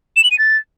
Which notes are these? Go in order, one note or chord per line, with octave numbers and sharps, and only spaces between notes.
E7
F#7
D#7
A6